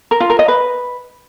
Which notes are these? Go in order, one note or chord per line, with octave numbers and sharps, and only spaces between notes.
A#4
F4
A#4
D#5
B4